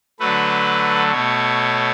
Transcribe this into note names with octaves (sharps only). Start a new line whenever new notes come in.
D3 F#3 A3 B4
B2 A3 C#5